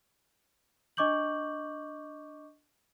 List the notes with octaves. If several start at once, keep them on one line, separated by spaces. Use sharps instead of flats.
D4 D#5 C#6 D6 G6 F#7